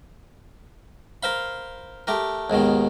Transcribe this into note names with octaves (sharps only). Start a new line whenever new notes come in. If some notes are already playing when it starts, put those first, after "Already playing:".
A#4 C5 F5 B5
A3 G4 A#4
D#2 G#2 B2 D#3